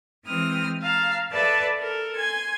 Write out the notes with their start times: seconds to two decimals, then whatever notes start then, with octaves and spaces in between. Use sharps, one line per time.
0.25 E3 G#3 C4 D#6 F6
0.81 F5 A5 A#5
1.31 A4 B4 D5 E5 A5
1.80 A4 A#4
2.15 G#5 C6 G#6